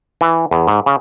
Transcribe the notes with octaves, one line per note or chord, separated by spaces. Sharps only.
E3
E2
G#2
C#3